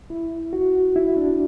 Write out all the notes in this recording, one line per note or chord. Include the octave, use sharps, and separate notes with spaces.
E4
F#4
E4
D4